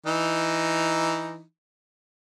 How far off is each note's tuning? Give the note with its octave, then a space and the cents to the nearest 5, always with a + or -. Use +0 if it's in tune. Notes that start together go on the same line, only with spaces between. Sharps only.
E3 +0 D#4 +0